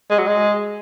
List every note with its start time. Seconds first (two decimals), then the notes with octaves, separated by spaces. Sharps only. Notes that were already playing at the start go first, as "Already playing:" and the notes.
0.10 G#3
0.19 F#3
0.27 G#3